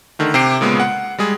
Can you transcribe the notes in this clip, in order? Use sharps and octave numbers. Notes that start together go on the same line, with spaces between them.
D3 D#3 A3
C3 G4 G5 C7 D7
A#2 C#3 G#3 B3
F#5
G3 G#3 G#4